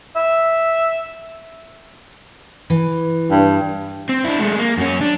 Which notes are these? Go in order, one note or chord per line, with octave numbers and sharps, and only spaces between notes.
E5
E3
G2
C4
D4 E4
G#3 A3
A#3
F#2 C#4
D4